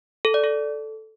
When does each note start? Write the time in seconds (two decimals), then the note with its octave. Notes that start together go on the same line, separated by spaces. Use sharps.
0.25 A4
0.34 D5
0.44 A4